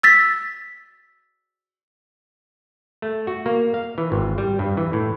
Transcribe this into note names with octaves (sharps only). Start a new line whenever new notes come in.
E6 A6 B6
A3
F#4
A#3
F5
E3
G#1
G3
G2
E3
A2